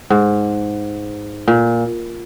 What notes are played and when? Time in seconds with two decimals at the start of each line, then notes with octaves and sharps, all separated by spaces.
0.10 G#2
1.48 A#2